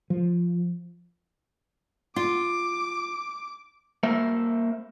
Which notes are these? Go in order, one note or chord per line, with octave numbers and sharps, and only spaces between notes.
F3
F4 D6
A#3 C5 E5